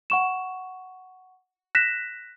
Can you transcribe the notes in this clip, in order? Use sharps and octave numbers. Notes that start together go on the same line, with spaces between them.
F#5 C#6 E7
F#6 A#6 B6 E7